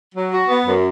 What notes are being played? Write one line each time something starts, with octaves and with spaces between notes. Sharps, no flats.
F#3
F#4
B3
F#2